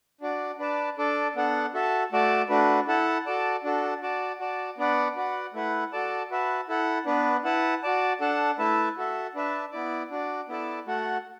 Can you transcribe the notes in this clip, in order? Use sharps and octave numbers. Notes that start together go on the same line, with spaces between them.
D4 F#4 D5
D4 B4 D5 A5
D4 A4 D5
B3 D4 A4 F#5
F#4 A4 E5 A5
A3 F#4 D5 A5
A3 D4 F#4 B4
E4 A4 F#5 A5
F#4 A4 D5 A5
D4 F#4 A4
F#4 D5 A5
F#4 D5 A5
B3 D4 B4 D5 F#5
F#4 B4 D5 F#5
A3 E4 B4 F#5
F#4 A4 D5 A5
F#4 B4 E5 A5
E4 A4 F#5
B3 D4 B4
E4 B4 F#5 A5
F#4 D5 A5
D4 A4 F#5 A5
A3 E4 B4 E5 A5
F#4 A4 E5
D4 B4 E5 A5
B3 E4 D5
D4 F#4 D5
B3 E4 A4 D5 A5
A3 F#4 A4 F#5